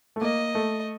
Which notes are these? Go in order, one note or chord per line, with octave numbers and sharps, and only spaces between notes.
A3
A#3 D#5
A3